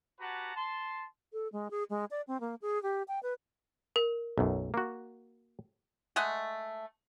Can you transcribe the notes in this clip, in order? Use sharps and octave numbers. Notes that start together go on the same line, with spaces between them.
F#4 G4 B4 F#5 A5 A#5
A5 C6
A4
G#3
G#4
G#3
D5
C4
A#3
G#4
G4
G5
B4
A#4
B1 F#2
A#3 F#4
G#3 A3 D#5 F#5